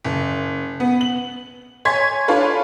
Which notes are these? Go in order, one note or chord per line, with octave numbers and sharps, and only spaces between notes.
F#1
B3
F#7
C#5 G#5 C6 G#6 B6
D4 F4 A4 B4 C#5